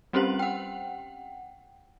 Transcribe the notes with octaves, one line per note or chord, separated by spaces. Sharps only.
G3 C4 C#4 G4 C5 F#7
F#5 G5